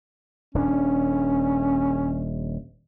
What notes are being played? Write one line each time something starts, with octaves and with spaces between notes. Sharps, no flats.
D#1 C#4 D4